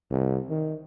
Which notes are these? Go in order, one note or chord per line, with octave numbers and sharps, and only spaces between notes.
C2
D#3